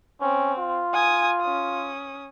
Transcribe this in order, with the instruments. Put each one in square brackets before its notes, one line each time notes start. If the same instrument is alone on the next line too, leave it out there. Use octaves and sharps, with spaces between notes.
[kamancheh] C4 [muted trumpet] C#4
[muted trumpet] F4
[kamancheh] G#5 D#6
C#4 D#6